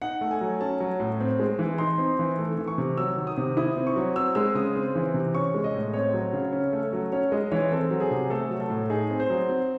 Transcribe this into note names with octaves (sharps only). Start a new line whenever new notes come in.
D#4 F#5
A3
G#5
F#3
C#4 A5
F#3
A2
C4
G#3
E3
D#4 C6
C4
E3
A3
E3
C#6
C3
F#3 E6
D#3
D#6
C3
E4 D#6
C4
C#6
F#3
C4 E6
G#3 E6
C#3 D#6
C4
E3
C3
C#4 C#6
G#3
D#5
A2
C4 C#5
F#3
C#3
C#4
A3
F#3
C#4 C#5
G#3 D#5
E3 C#5
C4 A4
F#3
G#4
C3
A3 A4
F#3
A4
A2
D#4 G#4
C4
C5
F#3
C4